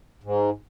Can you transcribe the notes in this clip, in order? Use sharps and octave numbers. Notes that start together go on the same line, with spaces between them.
G#2